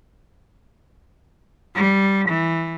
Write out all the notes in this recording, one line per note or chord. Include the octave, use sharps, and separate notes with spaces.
G3
E3